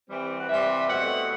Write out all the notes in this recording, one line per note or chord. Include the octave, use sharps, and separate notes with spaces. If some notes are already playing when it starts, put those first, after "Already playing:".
E3 G3 C4
F#5
E3 G3 C4 E5
B2 A3 C4 F#5